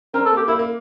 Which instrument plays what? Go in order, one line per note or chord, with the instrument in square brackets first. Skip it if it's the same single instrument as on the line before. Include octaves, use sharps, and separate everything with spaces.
[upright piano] C4 [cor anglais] A#4
[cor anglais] A4
[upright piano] A#3
[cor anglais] G4
[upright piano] A#3 [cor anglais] E4
[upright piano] A#3